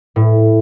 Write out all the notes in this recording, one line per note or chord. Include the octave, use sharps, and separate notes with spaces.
A2